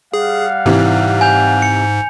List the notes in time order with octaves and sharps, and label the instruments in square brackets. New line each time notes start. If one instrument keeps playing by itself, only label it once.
[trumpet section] G3 F5 F#5 [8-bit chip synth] G#4
[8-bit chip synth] G#2 [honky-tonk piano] C3 E3
[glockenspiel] G#5 G6 F7
C#7